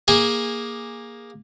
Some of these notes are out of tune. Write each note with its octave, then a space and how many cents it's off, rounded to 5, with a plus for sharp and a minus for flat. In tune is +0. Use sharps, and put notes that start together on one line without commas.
A#3 +10 G#4 -15 G#5 -20